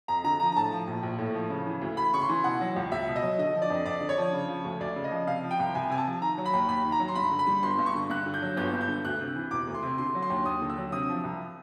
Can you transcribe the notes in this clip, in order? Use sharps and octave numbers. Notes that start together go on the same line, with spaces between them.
F2 A#5
D3 A#5
F3 A#5
A#5
A2 A5
F3
A#1
A#1
A2
F3
C#3
E3
D2
D2 B5
C#3 C#6
C6
E3
B2 F#5
F#3
C#2
C#2 E5
B2
D#5
F#3
D3 D#5
F3
D5
F2 D#5
F2 D5
D3
C#5
F3
C#3
F3
D2
D2 D5
C#3
D#5
F3
C3 F5
F3
G5
C2
C2 G#5
C3 G#5
A5
F3
D#3 A#5
F#3
B5
D#2
D#2 B5
D#3
A#5
F#3
C6
G2 B5
D3
B5
G3
G1 C6
G2
C#6
D3
G2 F#6
D3
G6
F#3
G1 G6
G2
G6
D3
D2 F#6
C3
E3
E1 D6
D2
C6
C3
D3 C6
F#3
C6
D#2
D#2 D#6
D3
E6
F#3
C3 D#6
F3
C2